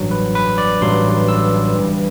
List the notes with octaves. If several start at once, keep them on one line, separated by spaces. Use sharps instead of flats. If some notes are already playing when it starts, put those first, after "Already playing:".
Already playing: A1 G2 F#3
B4
B4
D5
A1 G2 F#3 C6
E6
G1 G2 E3 G3